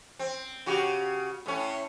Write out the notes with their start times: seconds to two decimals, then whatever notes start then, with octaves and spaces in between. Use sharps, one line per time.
0.19 C4
0.66 C#3 F#4 G4
1.46 A2 C#4